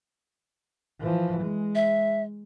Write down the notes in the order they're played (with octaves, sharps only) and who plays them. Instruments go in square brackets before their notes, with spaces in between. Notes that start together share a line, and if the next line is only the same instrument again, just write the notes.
[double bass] E3 F3
G#3
[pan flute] E5